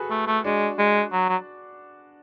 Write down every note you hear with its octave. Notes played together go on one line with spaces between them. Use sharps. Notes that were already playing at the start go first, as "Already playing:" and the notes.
Already playing: F#4 G#4 A4 B4
A3
A3
G#3 D4 F#4
G#3
F#3
F#3